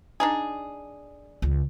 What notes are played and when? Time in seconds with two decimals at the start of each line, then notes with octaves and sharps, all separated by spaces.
0.20 D4 D#4 G#4
1.42 C#2